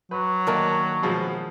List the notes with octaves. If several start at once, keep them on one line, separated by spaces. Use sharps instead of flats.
F#3 B4
D#3 A#3 D4
B2 F3 G#3